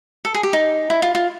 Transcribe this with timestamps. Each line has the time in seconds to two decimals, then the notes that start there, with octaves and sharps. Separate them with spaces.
0.25 A4
0.34 G#4
0.43 G4
0.53 D#4
0.90 E4
1.02 F4
1.15 F4